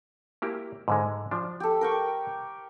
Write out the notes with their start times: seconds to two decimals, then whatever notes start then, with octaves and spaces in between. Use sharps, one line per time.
0.42 A#3 E4 G4
0.88 G#2 D3 G#3
1.31 F3 D4
1.60 G4 A4
1.81 A#4 G5 C#6